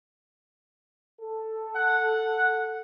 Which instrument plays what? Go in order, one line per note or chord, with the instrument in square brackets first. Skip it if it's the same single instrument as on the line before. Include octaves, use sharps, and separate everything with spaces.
[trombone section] A4
[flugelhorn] F#5